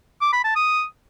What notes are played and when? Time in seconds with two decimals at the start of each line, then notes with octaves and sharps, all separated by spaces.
0.21 D6
0.33 B5
0.44 A5
0.56 D#6